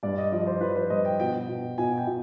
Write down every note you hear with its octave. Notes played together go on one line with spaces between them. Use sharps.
G2 D5
D#5
F3 D5
C5
F3 B4
C5
G2 D#5
G5
B2 G5
B2
B2 G#5
G5
B2